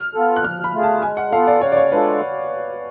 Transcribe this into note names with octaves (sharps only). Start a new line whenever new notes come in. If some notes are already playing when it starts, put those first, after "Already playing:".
Already playing: F6
B3 F4 A4
F#6
F3 F6
B5
A3 F4 G#4
A5
G#3 G#5
F#5
B3 F4 A4 F5
D5
C#3 C#5
D5
C#5
G#3 D4 F4 A4 B4